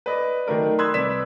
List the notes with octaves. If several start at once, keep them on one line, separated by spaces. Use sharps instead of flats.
B4 D5 D#5
D#3 F#3 A3 A#4 D5
B5 C6 D#6 E6 F#6 G#6
C2 B4 D5 B6 E7